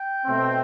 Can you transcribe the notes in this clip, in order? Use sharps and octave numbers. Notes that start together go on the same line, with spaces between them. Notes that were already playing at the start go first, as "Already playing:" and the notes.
Already playing: G5
B2 A3 C4